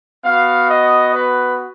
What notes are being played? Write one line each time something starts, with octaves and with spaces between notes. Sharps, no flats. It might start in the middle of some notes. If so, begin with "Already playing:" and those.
B3 F#4 F5
D#5
B4